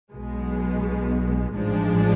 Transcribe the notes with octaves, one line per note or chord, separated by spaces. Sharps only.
B1 B2 G#3
A1 G#2 F3 G#3 D4